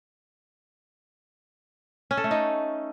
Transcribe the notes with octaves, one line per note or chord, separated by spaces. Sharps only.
C#4
A4
A3
D#4